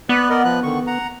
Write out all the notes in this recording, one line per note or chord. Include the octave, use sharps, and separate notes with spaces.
B3 B4 D5 F#6
A#4 D5 D#5
F3 B4 F#6
D3 D#3 C#6
F#5 A#5